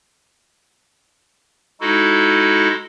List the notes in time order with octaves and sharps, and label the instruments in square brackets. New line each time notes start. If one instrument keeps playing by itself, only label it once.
[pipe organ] G#3 D#4 E4 F#4 A4